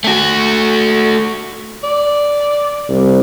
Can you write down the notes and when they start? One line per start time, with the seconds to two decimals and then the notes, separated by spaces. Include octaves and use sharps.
0.04 A3 F#4
1.83 D5
2.90 C2